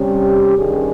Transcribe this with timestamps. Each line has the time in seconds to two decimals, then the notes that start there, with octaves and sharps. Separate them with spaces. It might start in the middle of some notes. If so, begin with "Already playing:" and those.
Already playing: C3 G3 C#4 G4
0.56 G2 D#3 G3 C#4 G#4